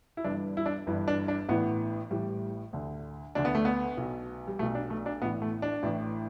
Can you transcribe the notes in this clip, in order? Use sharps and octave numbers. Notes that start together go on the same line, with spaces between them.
E4
G1 G2 E3 D4
E4
D4
G1 G2 E3
D4
D4
A1 A2 E3 B3
A1 A2 E3 G3
D2 D3
D2 D3 D4
B3
A3
B3
B1 B2
G3
B1 B2 A3
D4
A3
D4
A1 A2 E3 B3
A3
D4
A1 A2 E3